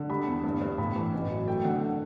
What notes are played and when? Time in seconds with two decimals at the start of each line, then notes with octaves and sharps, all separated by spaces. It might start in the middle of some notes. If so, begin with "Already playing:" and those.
Already playing: D3
0.10 G3 B5
0.27 E2
0.44 G2
0.61 G2
0.78 A2 B5
0.96 E3
1.13 A1
1.30 F#3
1.48 A3 G5
1.64 D3 F#5